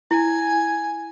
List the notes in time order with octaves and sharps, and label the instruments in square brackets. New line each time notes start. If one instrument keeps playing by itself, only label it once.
[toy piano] E4 [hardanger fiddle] G#5